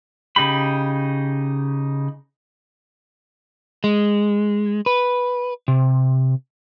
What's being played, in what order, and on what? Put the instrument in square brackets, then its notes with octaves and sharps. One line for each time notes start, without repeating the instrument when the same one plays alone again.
[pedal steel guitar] C#3 D#4 G4 B5
[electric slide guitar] G#3
B4
C3